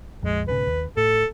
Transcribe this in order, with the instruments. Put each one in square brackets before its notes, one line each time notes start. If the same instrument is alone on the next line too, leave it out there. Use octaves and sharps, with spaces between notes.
[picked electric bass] A#1 F2 [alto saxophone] G#3
[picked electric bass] B1 G#2 C#3 [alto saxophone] B4
[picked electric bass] D#2
[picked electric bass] A2 [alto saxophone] A4